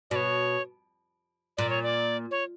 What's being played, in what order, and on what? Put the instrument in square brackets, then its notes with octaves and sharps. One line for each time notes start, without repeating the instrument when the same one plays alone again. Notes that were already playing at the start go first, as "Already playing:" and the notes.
[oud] B2 [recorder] C#5 D5
[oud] A#2 [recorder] D5
[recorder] C#5
D5
C#5